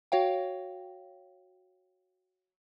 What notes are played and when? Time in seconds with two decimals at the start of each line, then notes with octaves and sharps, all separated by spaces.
0.12 F#4 C#5 F5 G5